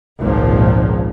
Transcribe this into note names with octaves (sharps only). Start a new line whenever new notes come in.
G#1 C#2 A#2 F3